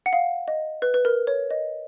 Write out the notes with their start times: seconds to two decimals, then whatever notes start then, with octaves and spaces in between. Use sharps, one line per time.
0.06 F#5
0.13 F5
0.48 D#5
0.82 B4
0.94 B4
1.05 A#4
1.27 C#5
1.51 D#5